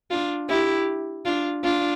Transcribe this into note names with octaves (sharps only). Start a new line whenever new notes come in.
D4 F4
E4 G4
D4 F4
D4 F4